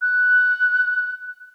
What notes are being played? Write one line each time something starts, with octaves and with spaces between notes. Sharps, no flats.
F#6